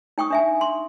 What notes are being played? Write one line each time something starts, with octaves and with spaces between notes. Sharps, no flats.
D#4 G5 C#6 D#6
D4 E5 G#5
C6